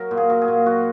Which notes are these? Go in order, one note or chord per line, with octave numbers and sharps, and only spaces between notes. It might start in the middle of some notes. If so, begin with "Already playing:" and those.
Already playing: F#3 A#4
A#2
G#4
F#3
G#4
A#2
F#3 F#4